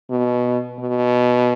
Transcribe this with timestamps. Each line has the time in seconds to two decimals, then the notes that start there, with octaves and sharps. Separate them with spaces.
0.10 B2
0.79 B2